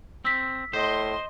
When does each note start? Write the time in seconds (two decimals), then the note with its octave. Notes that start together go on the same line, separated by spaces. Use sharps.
0.25 C4 E6 B6
0.73 A2 C5 D#5 C6